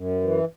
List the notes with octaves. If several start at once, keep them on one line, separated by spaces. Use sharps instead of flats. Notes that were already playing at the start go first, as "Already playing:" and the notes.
Already playing: F#2
E3